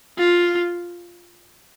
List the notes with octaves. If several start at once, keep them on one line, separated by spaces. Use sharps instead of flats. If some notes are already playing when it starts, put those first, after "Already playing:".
F4